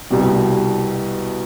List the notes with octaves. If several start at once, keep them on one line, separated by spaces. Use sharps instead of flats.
C2 B2 G3